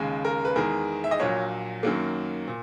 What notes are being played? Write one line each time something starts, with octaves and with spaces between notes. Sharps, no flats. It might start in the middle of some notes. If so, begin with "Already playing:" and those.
Already playing: D#2 C#3 G#3
A#4
B4
E2 D#3 G#3 A#4
E5
D#5
A#1 A#2 F#3 C#5
F#2 D#3 F#3 A#3
A#2